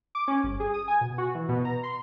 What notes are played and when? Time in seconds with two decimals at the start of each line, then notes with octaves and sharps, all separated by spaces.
0.15 D6
0.28 C#4
0.43 G1
0.60 G#4
0.74 D#6
0.88 G#5
1.01 B2
1.18 F#4
1.35 E3
1.49 B2
1.65 A#5
1.83 C6